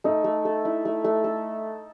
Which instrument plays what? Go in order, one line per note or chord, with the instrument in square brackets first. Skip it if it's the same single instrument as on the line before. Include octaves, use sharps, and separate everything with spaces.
[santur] A3 [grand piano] D#4
[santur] A3
A4
E4
A3
A3
A4